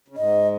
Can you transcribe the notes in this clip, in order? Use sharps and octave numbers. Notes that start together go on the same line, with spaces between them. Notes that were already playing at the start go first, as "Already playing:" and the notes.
C#3
G#2 D#5